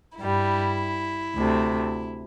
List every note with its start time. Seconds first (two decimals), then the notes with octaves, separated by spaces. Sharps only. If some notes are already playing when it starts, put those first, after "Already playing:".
0.18 G2 G3 E4
1.36 D2 C3 A3